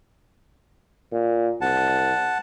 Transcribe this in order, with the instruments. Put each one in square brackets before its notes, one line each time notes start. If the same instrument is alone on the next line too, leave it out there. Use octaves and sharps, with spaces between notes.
[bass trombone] A#2
[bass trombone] C2 [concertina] F#5 A5